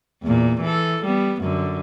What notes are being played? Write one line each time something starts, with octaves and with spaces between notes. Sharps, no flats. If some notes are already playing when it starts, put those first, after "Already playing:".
E2 A#2
E3 A4
G3 B3
F#2 D3